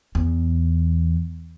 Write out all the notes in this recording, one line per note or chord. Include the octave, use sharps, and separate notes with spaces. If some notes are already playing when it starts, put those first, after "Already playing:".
E2